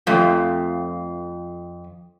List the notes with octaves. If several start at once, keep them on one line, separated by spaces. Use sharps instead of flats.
F2 A3 C4 F4